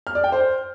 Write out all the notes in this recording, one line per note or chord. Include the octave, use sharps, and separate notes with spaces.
F6
D5
G5
C5